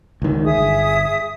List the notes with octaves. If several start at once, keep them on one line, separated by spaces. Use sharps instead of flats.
C#2 D#3
G#4 E5 D#6
G1